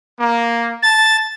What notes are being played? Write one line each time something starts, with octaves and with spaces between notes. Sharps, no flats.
A#3
A5 A6